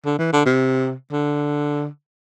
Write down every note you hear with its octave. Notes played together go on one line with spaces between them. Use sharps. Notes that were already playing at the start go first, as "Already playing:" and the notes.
D3
E3
D3
C3
D3